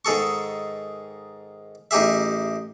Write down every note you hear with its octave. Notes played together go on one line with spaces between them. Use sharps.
G#2 D#3 G#4 A4 C#6
A1 D#4 G4 G#4 E5